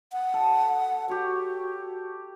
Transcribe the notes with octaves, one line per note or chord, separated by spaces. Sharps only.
F#5
A4
F#4 G4 C#5